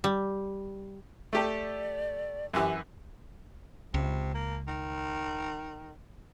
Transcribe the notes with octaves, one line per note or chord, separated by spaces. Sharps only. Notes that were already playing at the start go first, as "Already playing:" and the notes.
G3
A3 G4 A4 D5
F#2 E3 G4
C#2 C3
A#3
D#3